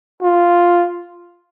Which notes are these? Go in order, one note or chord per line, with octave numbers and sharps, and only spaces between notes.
F4